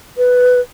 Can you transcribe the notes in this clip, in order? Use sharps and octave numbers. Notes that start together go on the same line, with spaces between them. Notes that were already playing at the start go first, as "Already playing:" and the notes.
B4